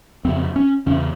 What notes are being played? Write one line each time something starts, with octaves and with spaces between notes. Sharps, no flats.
F2 C#3 C4
C#4
E2 C#3 C#4